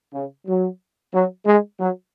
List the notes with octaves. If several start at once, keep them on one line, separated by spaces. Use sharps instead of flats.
C#3
F#3
F#3
G#3
F#3